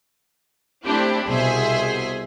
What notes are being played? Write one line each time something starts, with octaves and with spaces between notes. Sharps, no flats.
A3 C4 D4 E4 G4
C2 B2 G#4 C5 E5 C6